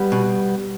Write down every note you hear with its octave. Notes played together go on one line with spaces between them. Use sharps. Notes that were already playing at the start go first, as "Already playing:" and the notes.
Already playing: G3 B3
B2